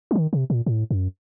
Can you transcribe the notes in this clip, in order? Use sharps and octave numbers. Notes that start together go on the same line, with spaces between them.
F#3
D#3
C3
A#2
A2
F#2